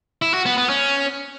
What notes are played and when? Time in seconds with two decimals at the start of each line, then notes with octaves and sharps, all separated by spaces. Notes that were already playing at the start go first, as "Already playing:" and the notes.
0.22 E4
0.34 F#4
0.46 B3
0.58 B3
0.69 C#4